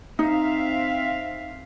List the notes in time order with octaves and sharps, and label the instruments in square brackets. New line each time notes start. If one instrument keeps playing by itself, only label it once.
[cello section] C4 E5 F5 [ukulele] D#4